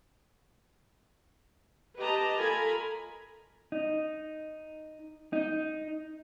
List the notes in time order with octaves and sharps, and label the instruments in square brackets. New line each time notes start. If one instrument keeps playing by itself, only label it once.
[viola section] G4 B4 D#5 A5 A#5
F4 A4 A#4 G#5 A#5 B5
[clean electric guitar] D#4
D#4